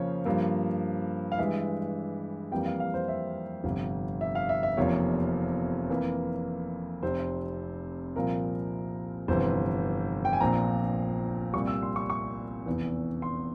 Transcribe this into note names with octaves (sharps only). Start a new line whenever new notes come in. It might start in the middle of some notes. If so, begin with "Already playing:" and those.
Already playing: F2 C#3 F3 A#3 C#5
G2 F3 A#3
F5
G2 E3 G#3 E5
F2 E3 G3 A#3 G5
F5
F5
C5
E5
G1 F2 C3
E5
F5
E5
E5
F1 E2 C3 F3 A#3 C#5
F2 E3 A#3
F1 F2 C3 C5
C2 A#2 F3 A#4
G1 F2 C3 E3 C5
G5
G#5
A#1 A#2 F3 C4 A#5
C2 A#2 G3 C#6
E6
C6
C#6
C#6
F1 E2 E3
C6